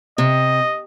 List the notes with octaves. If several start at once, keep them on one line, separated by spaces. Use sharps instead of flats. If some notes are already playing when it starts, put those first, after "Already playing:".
C3 D#5